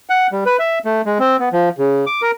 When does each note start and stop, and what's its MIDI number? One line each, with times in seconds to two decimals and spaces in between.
0.10 0.27 78
0.32 0.44 55
0.46 0.57 71
0.59 0.79 76
0.85 1.02 57
1.06 1.18 56
1.19 1.37 60
1.39 1.49 59
1.53 1.69 53
1.78 2.05 49
2.06 2.22 86
2.22 2.31 70